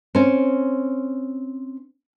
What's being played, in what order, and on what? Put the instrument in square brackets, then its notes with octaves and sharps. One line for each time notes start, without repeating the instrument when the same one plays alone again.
[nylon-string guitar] C4 C#4